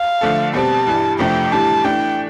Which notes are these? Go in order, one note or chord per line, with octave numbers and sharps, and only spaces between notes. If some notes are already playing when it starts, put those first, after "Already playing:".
Already playing: F5
D3 F3 A3 D4 A4
B2 G3 C4 G4 A5
G2 E3 G3
F2 C3 F3 A3 D4 G5
A2 E3 G3 D4 G4 A5
E3 A3 D4 G5